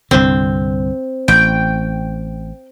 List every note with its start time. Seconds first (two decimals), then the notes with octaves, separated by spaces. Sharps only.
0.11 C2 G2 D3 C4
1.28 A1 G5